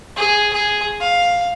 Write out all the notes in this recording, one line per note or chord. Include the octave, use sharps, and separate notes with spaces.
G#4
G#4
F5